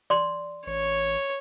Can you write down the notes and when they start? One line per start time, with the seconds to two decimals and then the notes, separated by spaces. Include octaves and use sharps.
0.10 D5 C6
0.67 A1 C#5